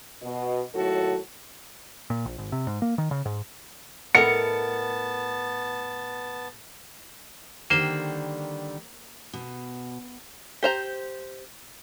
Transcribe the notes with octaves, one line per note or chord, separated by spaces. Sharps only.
B2 D#5
D#2 A2 F#3 F#4 A4
A#2
A#1
G#1
C3
G#2
A#3
D#3
C#3
G#2
A2 B3 A4 A#4 D#5 F#5 A5 C#7
D3 D#3 G3 A#3 C5
B2
G4 C5 A#5